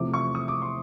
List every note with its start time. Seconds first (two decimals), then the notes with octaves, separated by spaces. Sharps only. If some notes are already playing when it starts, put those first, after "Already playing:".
Already playing: E2 C3 F3 A3 D6
0.14 C#6
0.35 D#6
0.48 D6
0.62 C6